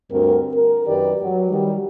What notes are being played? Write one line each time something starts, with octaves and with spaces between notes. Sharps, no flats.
D2 G2 C4 F#4 A#4
A#4
F#2 D#3 G4 B4 D5
F#3
D#3 G3